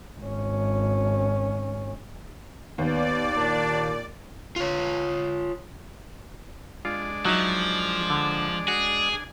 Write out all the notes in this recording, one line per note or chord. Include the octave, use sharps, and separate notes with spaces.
G#1 C#4
D#2 B3 D5
A#2 D4
F4 C#5
G#3 D4 F4 D5
F3 F#3 D#4 E5
D3
F#4 G#4
D4 G#5